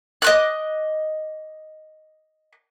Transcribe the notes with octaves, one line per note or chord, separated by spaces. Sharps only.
D#5 D6 F#6